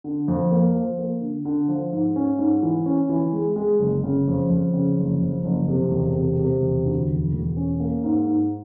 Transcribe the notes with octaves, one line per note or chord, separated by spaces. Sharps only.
D3
F2
A#3
F3
A#3
D3
D3
F3
G#2
C#4
G#2
E3
C#4
E3
G#3
G#3
F#1
C#3
F2
F2
C#3
F#1
F2
F#1
C3
E1
C3
C3
E1
D2
E1
E1
C#4
A#3
G#2
G#2